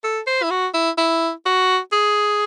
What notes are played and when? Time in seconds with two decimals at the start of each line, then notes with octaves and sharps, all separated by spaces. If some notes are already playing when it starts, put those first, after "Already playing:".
0.04 A4
0.27 C5
0.43 E4
0.50 F#4
0.74 E4
0.98 E4
1.46 F#4
1.92 G#4